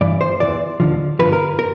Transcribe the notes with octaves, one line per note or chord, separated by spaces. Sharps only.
G2 E3 D5
C5
E2 C#3 E3 D5
D#2 D3 F3
G2 D3 F3 B4
A#4
A#4